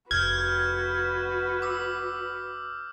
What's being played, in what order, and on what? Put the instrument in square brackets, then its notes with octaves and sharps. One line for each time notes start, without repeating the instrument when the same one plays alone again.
[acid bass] F1 [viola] F#4 B4 [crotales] F6 G6 [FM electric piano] G#6
[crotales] D6 E6